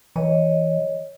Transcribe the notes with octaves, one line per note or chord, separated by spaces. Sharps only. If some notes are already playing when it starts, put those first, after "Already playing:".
E3 C#5 D#5